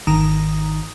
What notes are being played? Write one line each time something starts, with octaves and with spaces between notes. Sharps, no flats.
G#1 D#3 A#5 D#6